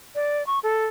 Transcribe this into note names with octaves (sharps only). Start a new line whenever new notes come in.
D5
C#6
A4